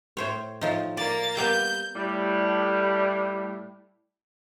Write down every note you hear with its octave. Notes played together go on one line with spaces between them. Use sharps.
A2 C5 C#5
A2 F3 D#4
A#3 D5 A6
G3 A#3 B3 G6
A2 G3